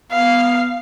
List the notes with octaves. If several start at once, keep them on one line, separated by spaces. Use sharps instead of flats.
B3 F5